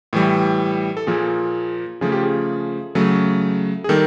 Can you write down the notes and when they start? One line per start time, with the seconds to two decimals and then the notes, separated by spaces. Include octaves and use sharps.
0.13 A2 E3 G3
0.97 A4
1.07 A#2 F3 A#3 G#4
2.01 C#3 F3 A3 G#4
2.12 G4
2.23 G#4
2.95 C#3 F#3 A3
3.84 G#4
3.89 D#3 G3 A#3 A4